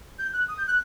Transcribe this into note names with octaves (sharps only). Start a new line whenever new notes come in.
G6
F#6
D#6
G6
F#6